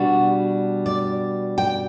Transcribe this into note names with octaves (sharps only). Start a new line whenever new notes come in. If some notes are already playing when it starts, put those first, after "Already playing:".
Already playing: B2 G3 D4 F#4
D5
G5